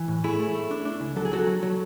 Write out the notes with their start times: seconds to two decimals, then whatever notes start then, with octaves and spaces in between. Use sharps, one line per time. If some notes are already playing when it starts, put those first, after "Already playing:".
Already playing: E3
0.08 A2
0.24 A3 E4 G#4
0.40 A3
0.55 A3
0.71 D4
0.85 D4
1.01 C#2
1.16 F#3 A4
1.25 G#4
1.31 F#3 F#4 A4
1.47 F#3
1.63 F#3